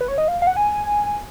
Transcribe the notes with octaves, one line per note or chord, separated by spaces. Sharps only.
B4
C#5
D#5
F5
F5
F#5
G#5